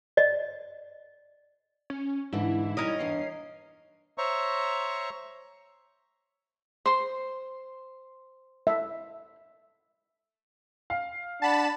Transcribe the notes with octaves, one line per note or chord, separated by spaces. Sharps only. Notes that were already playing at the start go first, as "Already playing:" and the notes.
D5 D#5
C#4
G#2 D3 E3 E4
G3 C#4 D#4 A#4 D#5
E2 G2 E3 C7
C5 C#5 E5 A#5 C#6
C5 C6
E5
F5
D4 F#5 A5 B5 E7